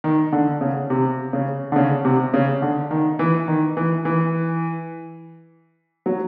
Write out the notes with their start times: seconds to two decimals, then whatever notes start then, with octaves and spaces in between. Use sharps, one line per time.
0.04 D#3
0.32 D3
0.61 C#3
0.90 C3
1.33 C#3
1.72 D3
1.76 C#3
2.05 C3
2.34 C#3
2.62 D3
2.91 D#3
3.19 E3
3.48 D#3
3.77 E3
4.05 E3
6.06 F#3